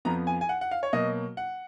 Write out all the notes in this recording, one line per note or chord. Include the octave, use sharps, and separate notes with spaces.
F2 F3 B3 A#5
G#5
G#5
F#5
F#5
F5
C#5
B2 F#3 A#3 D#5
F#5